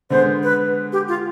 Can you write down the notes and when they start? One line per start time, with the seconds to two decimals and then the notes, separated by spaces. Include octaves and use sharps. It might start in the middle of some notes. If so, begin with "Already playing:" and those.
0.10 D3 G#3 B3 C5
0.43 B4
0.92 G4
1.08 F4